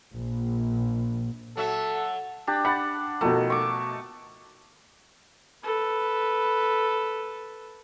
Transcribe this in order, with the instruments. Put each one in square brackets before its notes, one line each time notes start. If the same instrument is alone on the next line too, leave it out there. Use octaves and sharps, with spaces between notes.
[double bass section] A#1
[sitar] F#3 F#4 E5 [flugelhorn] A4
[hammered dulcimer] D4 G4
[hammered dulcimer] F#5 [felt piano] B5 F#6 A6
[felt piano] B2 F3 [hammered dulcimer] D#3 A3
[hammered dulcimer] C#6 D6
[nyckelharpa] A4 B4